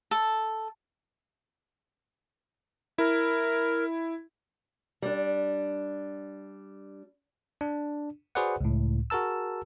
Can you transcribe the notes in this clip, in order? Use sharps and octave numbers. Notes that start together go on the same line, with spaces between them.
A4
E4 A#4
G3 D4
D4
F#4 G#4 B4 C5 D5 F#5
C#2 A2
F#4 G#4 A#4 A5 E6